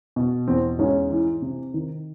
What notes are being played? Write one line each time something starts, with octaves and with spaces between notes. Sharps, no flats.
B2
E2 C4
G#2 C#4
E3
C3
D#3